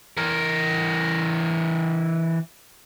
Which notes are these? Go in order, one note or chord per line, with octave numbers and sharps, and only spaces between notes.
E3 A#4